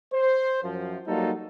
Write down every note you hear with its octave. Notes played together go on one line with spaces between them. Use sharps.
C5
F#2 F3
F#3 G3 A#3 D#4 F4 A4